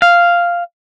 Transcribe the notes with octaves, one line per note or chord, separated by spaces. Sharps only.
F5